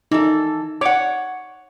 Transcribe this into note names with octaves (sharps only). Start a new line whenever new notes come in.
E3 D#4 A4
C#5 F#5 D6